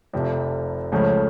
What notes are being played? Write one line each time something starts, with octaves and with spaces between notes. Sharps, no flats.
F1 F2 C3 F3
C#2 C#3 F3 A3 C#4